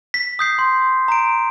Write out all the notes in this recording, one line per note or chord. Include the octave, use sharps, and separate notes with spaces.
B6
D#6 G6 C7
C6
A#5 D7